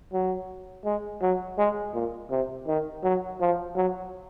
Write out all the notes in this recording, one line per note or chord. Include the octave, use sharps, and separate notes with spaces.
F#3
G#3
F#3
G#3
A#2
C3
D#3
F#3
F3
F#3